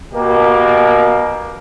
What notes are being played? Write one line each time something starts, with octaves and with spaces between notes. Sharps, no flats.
B2 A#3 G4 A#4